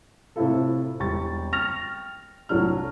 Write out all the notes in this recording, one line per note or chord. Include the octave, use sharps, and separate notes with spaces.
A2 C3 C4 E4 F4 A4
E1 G3 G5 C#6 A6
G5 C#6 F6 A6 A#6 F7
C2 A2 F#3 D4 F6